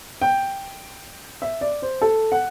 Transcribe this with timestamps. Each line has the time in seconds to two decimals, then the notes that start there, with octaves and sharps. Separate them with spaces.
0.22 G5
1.42 E5
1.61 D5
1.82 C5
2.01 A4
2.32 F#5